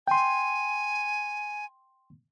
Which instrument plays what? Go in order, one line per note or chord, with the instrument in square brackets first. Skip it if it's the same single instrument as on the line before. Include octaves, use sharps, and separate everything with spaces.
[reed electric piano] G5 C6 [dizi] G#5